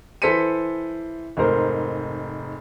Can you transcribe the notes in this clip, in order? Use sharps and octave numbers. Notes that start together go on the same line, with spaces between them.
E3 A4 C5 B6 C#7 D#7
F1 G#2 A#4 C5